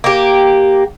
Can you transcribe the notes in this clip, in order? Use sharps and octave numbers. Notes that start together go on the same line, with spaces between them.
A#3 G4